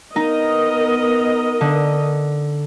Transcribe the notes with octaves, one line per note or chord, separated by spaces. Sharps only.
B3 D#4 A#4 D#5
D3